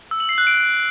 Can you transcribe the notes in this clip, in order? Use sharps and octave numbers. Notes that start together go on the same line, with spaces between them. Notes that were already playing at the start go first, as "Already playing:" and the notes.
E6
F#7
C7
F#6
D7